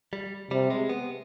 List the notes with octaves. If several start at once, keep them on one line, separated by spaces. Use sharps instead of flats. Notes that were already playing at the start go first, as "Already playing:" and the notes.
G3
C3 G3
G#3
B3